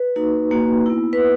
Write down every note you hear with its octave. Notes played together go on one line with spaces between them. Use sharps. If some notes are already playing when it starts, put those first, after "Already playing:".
Already playing: B4
A#3 D#4 F#4
A#3 D#4 F#4
B3 E4
B4